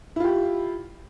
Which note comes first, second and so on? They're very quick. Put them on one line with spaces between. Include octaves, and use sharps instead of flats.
E4 F4 G4